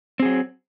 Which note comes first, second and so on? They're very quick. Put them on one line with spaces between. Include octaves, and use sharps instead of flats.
C4 G#4 F#3